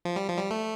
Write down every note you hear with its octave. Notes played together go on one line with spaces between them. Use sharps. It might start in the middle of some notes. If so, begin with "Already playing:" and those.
F3
G3
F3
G3
A3